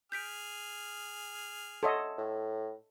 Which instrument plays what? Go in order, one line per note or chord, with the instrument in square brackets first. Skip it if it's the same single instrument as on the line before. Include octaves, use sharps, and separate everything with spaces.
[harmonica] G#4 F6 [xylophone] G6 B6 D7
[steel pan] A4 C#5 D#5 [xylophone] E5 F#5 C6
[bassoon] A2